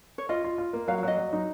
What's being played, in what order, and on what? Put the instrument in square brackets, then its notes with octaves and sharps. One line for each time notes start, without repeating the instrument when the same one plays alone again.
[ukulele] C#5
[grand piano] F4 [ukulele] D#5
[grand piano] F4
F4
A#3
[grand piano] F#3 [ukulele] F5
[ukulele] F5
[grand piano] F#3 [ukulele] D#5
[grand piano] F#3
D#4